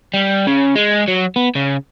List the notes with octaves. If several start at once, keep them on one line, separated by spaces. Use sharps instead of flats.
G3
C#3
G#3
F#3
B3
C#3